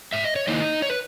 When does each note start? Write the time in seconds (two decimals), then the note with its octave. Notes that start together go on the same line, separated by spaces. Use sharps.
0.13 G#2 E5
0.24 D#5
0.36 C#5
0.48 D#3 A#3 D#4 E4 D#5
0.82 C#5
0.89 B4